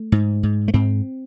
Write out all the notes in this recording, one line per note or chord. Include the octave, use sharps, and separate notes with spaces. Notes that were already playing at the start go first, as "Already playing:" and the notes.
Already playing: A3
G#2
G#2
A3
G#2 C4